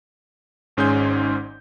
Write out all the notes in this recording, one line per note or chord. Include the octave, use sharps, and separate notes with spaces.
G#1 G#2 C#4 G#4 C6 G6